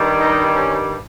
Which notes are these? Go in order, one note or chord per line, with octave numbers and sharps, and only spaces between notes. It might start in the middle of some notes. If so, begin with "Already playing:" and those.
Already playing: G2 D#3 G3
D#4
C#4